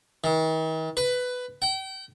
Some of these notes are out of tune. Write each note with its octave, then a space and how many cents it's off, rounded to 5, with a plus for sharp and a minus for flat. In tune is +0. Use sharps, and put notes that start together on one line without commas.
D#3 +45
B4 +10
G5 -35